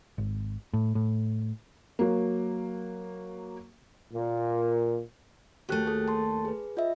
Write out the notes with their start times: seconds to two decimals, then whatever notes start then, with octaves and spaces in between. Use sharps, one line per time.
0.18 G#1
0.73 A2
0.95 A2
1.99 F#3 A#3
4.13 A#2
5.69 D#2 A3 F#4 G4 F#6
5.86 G#4 A4
6.08 A5 C6
6.45 G#4 B4
6.77 F4 D#5 E5